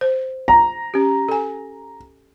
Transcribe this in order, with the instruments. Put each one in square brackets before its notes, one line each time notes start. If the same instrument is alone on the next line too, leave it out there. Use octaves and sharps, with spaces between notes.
[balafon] C5
[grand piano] A#5
[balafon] C#4 G4
A4 G#5